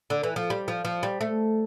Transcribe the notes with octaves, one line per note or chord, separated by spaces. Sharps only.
D3
E3
F3
G3
F3
F3
G3
A3